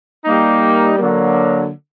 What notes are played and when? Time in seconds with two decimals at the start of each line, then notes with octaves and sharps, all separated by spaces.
0.25 G3 A#3 D#4
0.97 D3 F#3 A#3